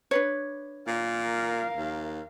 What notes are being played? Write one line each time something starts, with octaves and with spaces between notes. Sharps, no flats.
D4 B4 C#5
A#2 A#4 F5
D#2